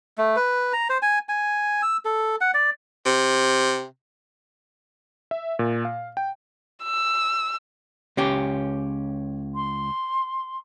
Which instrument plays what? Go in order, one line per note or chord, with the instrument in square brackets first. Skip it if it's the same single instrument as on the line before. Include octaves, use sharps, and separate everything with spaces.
[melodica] A3
B4
A#5
C5
G#5
G#5
E6
A4
F#5
D5
[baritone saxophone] C3
[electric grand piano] E5
A#2
F5
G5
[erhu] E6
[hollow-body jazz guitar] C#2 C#4 G4
[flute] C6